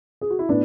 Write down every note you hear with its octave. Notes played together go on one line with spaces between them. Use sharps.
G#4
F#4
E4
A2 B3 D4